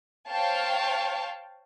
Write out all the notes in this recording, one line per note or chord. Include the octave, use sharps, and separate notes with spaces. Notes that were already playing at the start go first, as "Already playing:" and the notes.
C5 C#5 F5 G5 A5